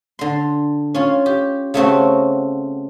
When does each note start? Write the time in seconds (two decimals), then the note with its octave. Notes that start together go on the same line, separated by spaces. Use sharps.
0.19 D3 C6
0.94 C#4 F4
1.26 G4
1.74 C#3 A3 C4 F#4